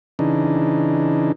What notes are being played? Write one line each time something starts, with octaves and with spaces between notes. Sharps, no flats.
C#3 E3 D4 D#4